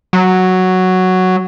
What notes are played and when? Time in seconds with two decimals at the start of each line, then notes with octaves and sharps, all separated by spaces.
0.13 F#3